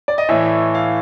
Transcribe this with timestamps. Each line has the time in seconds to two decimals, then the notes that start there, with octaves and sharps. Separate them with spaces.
0.08 D5
0.18 D#5
0.29 A2 E3 A3 E5
0.75 F5